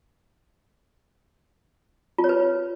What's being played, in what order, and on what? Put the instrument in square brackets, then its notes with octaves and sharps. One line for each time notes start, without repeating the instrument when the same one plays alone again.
[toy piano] F4
C#5
B4